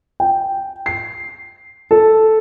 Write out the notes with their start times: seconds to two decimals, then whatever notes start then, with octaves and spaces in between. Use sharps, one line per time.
0.20 G5
0.86 C7
1.91 A4